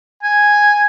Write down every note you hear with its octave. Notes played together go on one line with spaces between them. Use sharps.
G#5